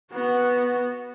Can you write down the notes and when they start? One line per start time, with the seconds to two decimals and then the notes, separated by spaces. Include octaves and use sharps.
0.12 B3 F#4